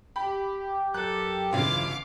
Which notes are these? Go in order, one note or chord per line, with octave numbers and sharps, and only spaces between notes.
G4 B5
F#2 A4 A#4 F#6
G1 C#2 C#3 E3 F#3 F4 F5 D6